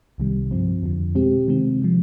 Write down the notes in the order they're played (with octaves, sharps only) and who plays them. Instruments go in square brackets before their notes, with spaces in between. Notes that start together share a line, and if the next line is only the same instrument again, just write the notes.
[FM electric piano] C2 C3 D#3 G3
G2 F3 C4
F2 D3 F3
B2 G#3 C4 G4
C3 D#3 G#3 C4
C3 F3